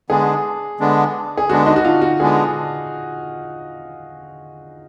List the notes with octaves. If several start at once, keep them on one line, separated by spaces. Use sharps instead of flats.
D3 G#3 B3 D4 G#4
D3 G#3 B3 D4
G#4
D3 G#3 B3 D4 F#4
D#4
F#4
F4
F#4
D3 G#3 B3 D4 G#4